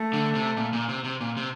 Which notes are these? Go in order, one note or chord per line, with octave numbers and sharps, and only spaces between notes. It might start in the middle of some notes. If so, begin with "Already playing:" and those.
Already playing: A3
D3
C3
A#2
A#2
C3
C3
A#2
C3